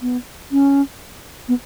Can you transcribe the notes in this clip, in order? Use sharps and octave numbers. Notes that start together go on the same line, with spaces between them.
B3
C#4
B3